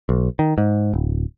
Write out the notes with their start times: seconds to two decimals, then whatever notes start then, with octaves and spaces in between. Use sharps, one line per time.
0.09 B1
0.39 D#3
0.58 G#2
0.93 D1